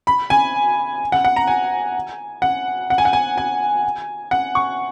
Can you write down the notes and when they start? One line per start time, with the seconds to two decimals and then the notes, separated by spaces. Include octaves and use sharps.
0.07 B5
0.30 G#5
1.12 F#5
1.25 F#5
1.36 A#5
1.48 G#5
2.42 F#5
2.90 F#5
2.98 G#5
3.05 F#5
3.13 G#5
3.38 G#5
4.31 F#5
4.55 C#6